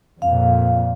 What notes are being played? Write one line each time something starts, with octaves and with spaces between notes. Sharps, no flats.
F2 A#2 F5